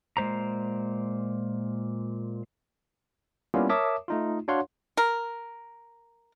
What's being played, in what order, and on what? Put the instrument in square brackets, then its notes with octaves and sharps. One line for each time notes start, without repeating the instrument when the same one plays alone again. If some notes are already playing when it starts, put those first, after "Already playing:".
[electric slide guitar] A#2 G#3 C5 A#5
[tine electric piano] G3 A#3 B3 C#4 E4 F4
A#4 C#5 E5 A5 D6 D#6
A3 D#4 F4
D4 F#4 C#5 F5 F#5 C6
[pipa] A#4